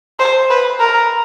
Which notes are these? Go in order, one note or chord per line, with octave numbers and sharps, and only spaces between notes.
C5
B4
A#4